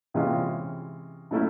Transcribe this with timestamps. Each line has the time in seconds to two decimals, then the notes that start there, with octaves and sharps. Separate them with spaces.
0.14 C3 E3 G#3 C#4 F4
1.31 B2 F#3 A3 C#4 E4